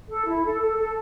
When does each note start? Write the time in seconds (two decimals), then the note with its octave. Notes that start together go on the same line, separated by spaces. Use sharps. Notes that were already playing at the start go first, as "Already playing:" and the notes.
0.09 A4
0.27 E4
0.45 A4
0.62 A4
0.78 A4